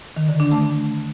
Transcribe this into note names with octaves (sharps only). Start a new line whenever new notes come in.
D#3
D3
D4
A3